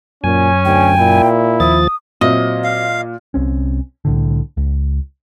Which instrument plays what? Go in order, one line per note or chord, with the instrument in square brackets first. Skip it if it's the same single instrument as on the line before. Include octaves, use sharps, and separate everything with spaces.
[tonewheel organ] F#2 G#5 [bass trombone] A#2 [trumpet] C#4
[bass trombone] D2 [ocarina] G5
[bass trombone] A#2 [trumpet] E4
[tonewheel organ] D#2 F3 A6 [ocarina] D#6
[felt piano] A#2 [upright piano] F#3 C4 E5 [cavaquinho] D#5
[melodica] F5
[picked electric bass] C2 C4 C#4
C2 A2 D3
C#2